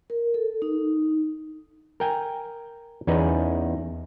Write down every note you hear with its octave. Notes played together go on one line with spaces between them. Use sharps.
A#4
A4
D#4
A#4 G5 G#5
E2 C#4 D#4 G#4 B4